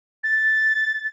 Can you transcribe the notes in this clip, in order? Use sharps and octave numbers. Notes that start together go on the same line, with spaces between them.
A6